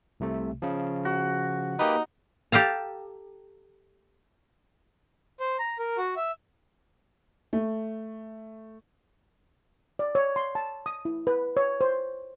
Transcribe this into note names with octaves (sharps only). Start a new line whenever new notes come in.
C2 C3 A3
C#3 F3
F#4
A#3 D#4 G4 B4
G4 A4 F5 A#5
C5
A#5
A#4
F#4
E5
A3
D5
C#5
C6
A5
D#6
E4
B4
C#5
C5